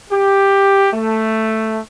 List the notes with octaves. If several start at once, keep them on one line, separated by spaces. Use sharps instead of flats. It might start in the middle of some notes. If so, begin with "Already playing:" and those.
G4
A3